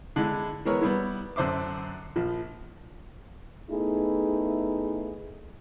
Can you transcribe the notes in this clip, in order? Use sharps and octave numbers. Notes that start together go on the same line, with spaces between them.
D3 G#3 E4
E3 G#3 B3 A#4 C#5
G3 B3 E4
F#2 D3 C5 E5 D6
A#1 F3
A3 B3 D#4 E4 G#4